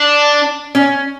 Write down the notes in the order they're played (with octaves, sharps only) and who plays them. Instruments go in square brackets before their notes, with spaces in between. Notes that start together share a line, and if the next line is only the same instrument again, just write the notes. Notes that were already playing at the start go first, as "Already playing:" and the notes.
Already playing: [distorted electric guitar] D4
[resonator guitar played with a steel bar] C#4